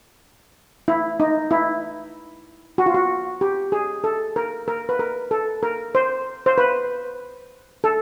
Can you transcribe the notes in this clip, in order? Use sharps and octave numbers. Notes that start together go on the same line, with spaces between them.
E4
D#4
E4
F#4
F4
F#4
G4
G#4
A4
A#4
A#4
B4
A#4
A4
A#4
C5
C5
B4
A4